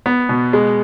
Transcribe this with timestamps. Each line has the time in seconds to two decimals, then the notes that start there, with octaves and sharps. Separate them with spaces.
0.06 B3
0.29 B2
0.53 G#3